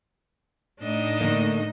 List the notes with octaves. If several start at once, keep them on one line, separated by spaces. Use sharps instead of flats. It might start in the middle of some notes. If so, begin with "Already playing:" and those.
A2 D4 D#4 D#5
D3 A3 A#3